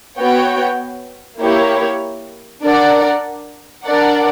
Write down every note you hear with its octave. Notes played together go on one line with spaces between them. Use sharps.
B3 F#4 C#5 G5
A#3 E4 G4 C#5
D4 A#4 D5 F#5
D4 A#4 D5 F#5